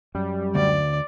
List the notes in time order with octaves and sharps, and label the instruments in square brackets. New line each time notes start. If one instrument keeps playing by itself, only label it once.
[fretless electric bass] F#2 [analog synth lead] G3
[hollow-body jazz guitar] D2 [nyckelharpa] D5